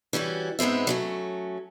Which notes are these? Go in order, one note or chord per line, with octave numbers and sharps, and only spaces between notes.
E3 G3 C#4 F#4
G#2 G#3 B3 C4 E5
F#3 A3 C#4